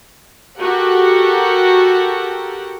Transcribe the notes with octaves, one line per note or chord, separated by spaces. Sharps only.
F#4 G4 A4 A#4 F#5 G5